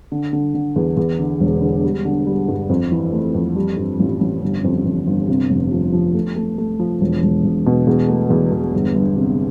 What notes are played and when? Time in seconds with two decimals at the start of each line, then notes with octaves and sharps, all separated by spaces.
0.12 D3
0.33 D3
0.54 D3
0.76 E2
0.97 E2
1.19 D3
1.40 E1
1.62 D3
1.83 G3
2.05 D3
2.27 G3
2.48 G2
2.70 F2
2.92 E3
3.13 A3
3.34 F2
3.56 G3
3.77 G2
4.00 A1
4.21 A1
4.42 G1
4.64 F2
4.85 F2
5.07 G1
5.29 C3
5.50 F1
5.71 F3
5.93 F3
6.15 A3
6.36 A3
6.58 A3
6.79 F3
7.01 E1
7.23 E1
7.44 E1
7.66 B2
7.87 E2
8.08 A3
8.30 E2
8.52 E2
8.73 G1
8.95 G1
9.17 C3